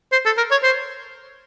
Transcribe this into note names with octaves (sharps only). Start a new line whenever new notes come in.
C5
A4
A#4
C#5
C5